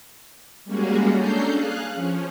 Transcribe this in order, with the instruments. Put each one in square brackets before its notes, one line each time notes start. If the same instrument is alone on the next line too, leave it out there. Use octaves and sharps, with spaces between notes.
[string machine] G3 G#3 A#3 C#4 F#4 G#4
C#4 D4 A4 A#5 G6 C7
G#4 F5 F#6
F3 C#4